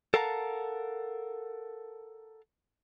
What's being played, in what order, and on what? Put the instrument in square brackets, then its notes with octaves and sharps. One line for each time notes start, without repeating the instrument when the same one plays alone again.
[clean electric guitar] A4 A#4 F5 F#5 A5 A#5